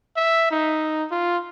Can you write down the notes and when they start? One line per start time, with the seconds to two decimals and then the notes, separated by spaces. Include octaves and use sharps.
0.16 E5
0.51 D#4
1.11 F4